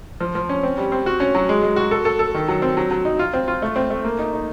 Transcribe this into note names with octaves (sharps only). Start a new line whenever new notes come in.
F3
F3
C#4
C4
G3
C4
F#4
C#4
F#3
G#3
G#3
F#4
A4
A4
A4
D#3
F#3
C4
F#3
F#3
D#4
F4
C4
F4
A3
C4
A3
A#3
D#4
D#4